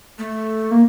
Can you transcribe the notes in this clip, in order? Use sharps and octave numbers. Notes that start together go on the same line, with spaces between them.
A3
A#3